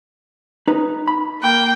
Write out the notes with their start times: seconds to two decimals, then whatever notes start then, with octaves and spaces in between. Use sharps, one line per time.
0.68 D#4 B4
1.08 B5
1.42 A#3 G5